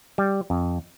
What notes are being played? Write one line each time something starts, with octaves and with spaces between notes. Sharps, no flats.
G3
F2